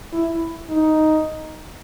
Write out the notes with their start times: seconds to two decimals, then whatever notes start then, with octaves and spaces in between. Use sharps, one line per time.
0.13 E4
0.70 D#4